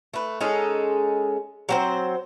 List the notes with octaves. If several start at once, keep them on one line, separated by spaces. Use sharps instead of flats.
A3 B4
G#3 C#4 D#4 A4
F#3 C4 C5